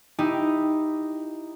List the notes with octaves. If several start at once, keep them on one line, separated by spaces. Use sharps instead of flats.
D#4 E4 G4